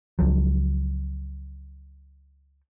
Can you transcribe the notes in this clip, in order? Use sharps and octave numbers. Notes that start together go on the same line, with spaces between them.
C#2 F3 F#3